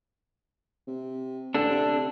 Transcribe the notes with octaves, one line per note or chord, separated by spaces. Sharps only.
C3
A1 D4 A4
C3